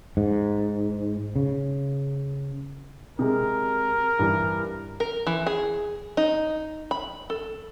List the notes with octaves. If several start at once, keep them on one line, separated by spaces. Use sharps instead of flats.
G#2
C#3
C3 G#3 A#4
G2 E3
A#4
E3
G#4
D#4
B5
A4